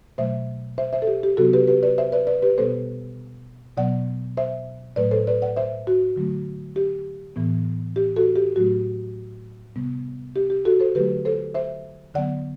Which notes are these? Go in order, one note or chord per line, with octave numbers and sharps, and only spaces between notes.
B2 F#3 A3 C5 E5
C5 E5
C5 E5
A4
G4
G4
C3 F#3 B3 F#4 A4
G4 B4
G4 B4
B4 D5
C5 E5
B4 D5
B4 D5
G4 B4
B2 G3 B3 A4 C5
B2 F#3 B3 D5 F#5
C5 E5
A2 F#3 A3 B4 D5
A4 C5
B4 D5
D5 F#5
C5 E5
F#4
D3 F#3 A3
G4
A2 E3 B3
G4
F#4 A4
G4
A2 F#3 A3 F#4
C3 G3 B3
G4
G4
F#4 A4
A4 C5
D3 F#3 A3 G4 B4
A4 C5
C5 E5
D3 F#3 B3 D5 F#5